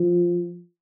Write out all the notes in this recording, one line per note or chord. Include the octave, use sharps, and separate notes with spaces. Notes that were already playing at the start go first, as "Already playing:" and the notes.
Already playing: F3